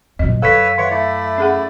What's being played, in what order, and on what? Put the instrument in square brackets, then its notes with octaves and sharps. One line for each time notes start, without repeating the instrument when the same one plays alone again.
[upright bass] F#2 A#2 [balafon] D#5
[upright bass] F#2 [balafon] A4 [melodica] B4 C#5 E6 [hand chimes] F5 B6
[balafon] D#3 B4 E5 [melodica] C#5 F#5
[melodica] A3 E4 D5
[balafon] C#4 G#4 F#5